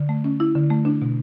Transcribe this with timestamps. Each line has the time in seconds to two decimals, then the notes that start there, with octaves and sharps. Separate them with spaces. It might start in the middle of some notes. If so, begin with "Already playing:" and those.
Already playing: D3
0.09 A3
0.24 C#4
0.40 E4
0.55 D3
0.70 A3
0.85 D4
1.02 B2